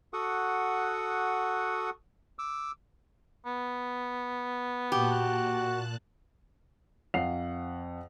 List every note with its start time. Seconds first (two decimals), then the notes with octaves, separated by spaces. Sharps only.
0.13 F#4 A4 F#5 C#6 D#6
2.39 D6 E6
3.45 B3
4.92 A#2 F#4 G4 A5 F#6
7.14 F2 F5 F#5 C7 F7